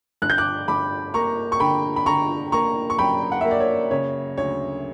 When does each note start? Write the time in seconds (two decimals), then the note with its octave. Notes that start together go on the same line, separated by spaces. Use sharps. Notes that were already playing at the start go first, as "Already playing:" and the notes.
0.22 G1 F#6
0.30 G6
0.38 D6 F#6
0.68 G1 B5 D6
1.14 A#3 A#5 C#6
1.52 C#6
1.60 D3 G5 B5
1.96 B5
2.06 D3 A#5 C#6
2.52 A#3 A#5 C#6
2.90 C#6
2.98 F#2 G5 B5
3.32 F#5
3.41 A#3 E5
3.51 D5
3.60 C#5
3.91 C#3 C#5
4.37 D2 C#5